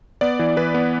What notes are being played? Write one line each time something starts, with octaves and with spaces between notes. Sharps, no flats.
B3 D5
E3
E3 B4
B3